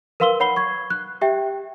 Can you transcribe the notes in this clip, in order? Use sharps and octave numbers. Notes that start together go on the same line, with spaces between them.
A#4 B4 F5 C6 E6 G7
C#5 F#5 B5 C7 G7
C#6 G#6
F#6
G4 E5 G5